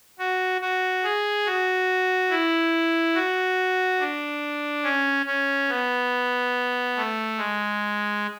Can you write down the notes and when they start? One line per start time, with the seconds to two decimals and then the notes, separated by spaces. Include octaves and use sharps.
0.19 F#4
0.61 F#4
1.03 G#4
1.46 F#4
2.30 E4
3.14 F#4
4.00 D4
4.83 C#4
5.26 C#4
5.69 B3
6.96 A3
7.38 G#3